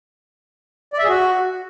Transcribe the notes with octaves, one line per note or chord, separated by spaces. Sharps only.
D5
E5
G#4
F#4